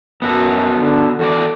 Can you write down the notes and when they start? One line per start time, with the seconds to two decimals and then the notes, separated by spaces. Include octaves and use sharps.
0.22 F#2 B3 F#4 A4
0.77 D3
1.19 E2 F#4 A4 D5